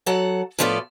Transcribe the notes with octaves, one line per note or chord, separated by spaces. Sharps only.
F#3 A4 F#5
A2 F3 B3 F4 A4 D5